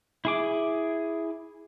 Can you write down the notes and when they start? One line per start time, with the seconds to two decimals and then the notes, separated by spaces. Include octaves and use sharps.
0.25 E4 G#4 D6